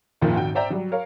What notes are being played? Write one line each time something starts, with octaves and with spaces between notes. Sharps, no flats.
F#1 D#2 A#2 F3
G#1 D#2 F#4 G5
C5 D5 E5 G5 A#5
F#3 G3
A#4 C#5 F5